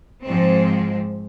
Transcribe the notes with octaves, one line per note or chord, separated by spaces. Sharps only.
G#2 F3 C4